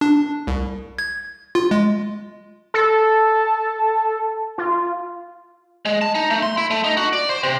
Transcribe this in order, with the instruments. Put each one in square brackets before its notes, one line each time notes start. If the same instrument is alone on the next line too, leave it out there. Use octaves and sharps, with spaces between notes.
[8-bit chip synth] D4
C2
G#6
F4
G#3
[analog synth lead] A4
F4
[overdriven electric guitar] G#3
A5
D#4
A3
C6
E4
A3
D#4
F#4
D5
C5
C3